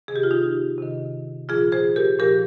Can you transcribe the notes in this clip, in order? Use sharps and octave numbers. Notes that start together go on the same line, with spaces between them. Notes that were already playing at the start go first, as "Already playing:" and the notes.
C3 D#3 G#4
G4
F4
D#4 G4
C3 D#3
A#2 F3 F4 G#4
G#4 C5
G4 A#4
A#2 F3 G4 A#4